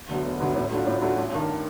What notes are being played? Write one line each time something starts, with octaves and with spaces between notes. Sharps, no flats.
D2 D3 F#3 B3
E1
D2 D3 F#3 B3
A2
F#3 A3 D4 F4
A2
F#3 A3 D4 F4
A1
G2 D#3